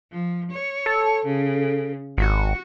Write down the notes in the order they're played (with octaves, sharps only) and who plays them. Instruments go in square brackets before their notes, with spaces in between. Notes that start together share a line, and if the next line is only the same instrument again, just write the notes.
[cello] F3
C#5
[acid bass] A4
[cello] C#3
[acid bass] G#1 [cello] F#4